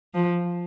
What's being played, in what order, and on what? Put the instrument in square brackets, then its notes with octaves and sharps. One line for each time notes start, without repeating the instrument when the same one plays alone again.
[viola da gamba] F3